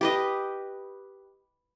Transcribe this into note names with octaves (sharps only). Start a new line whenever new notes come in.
G4 B4 D#5